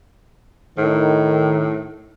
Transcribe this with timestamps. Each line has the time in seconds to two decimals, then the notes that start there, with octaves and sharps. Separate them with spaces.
0.78 A2 D#3